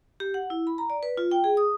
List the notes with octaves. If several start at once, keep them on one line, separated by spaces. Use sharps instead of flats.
G4
F#5
E4
B5
A#5
D5
B4
F4
G5
G#4
D#6